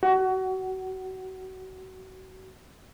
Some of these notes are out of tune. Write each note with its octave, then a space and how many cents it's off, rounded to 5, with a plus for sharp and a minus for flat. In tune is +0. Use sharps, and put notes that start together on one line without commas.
F#4 +25